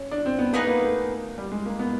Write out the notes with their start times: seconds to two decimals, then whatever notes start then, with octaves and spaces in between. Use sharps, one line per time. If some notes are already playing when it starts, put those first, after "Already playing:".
Already playing: C#4
0.11 D4
0.26 C4
0.39 B3
0.53 A#3 B3 D#4 G#4 B4
0.67 A#3
0.82 A3
1.38 G3
1.52 G#3
1.66 A#3
1.79 B3